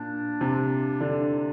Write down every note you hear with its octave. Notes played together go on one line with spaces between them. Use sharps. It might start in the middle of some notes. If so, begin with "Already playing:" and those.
Already playing: A#2 D4
C3
D3